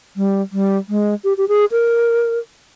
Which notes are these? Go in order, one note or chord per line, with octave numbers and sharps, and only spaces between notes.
G3
G3
G#3
G4
G4
G#4
A#4